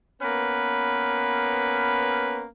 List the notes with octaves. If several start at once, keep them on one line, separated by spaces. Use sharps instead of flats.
A#3 B3 C#4 B4